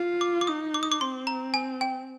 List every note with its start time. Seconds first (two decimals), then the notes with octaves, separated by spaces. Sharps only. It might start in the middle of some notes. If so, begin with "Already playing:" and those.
Already playing: F4
0.21 D6
0.41 D6
0.47 D#4 D#6
0.74 D6
0.83 D#6
0.92 D6
1.01 C4 C6
1.27 A#5
1.54 G#5
1.81 G5